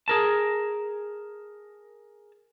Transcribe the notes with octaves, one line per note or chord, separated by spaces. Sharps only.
G#4 A#4 A5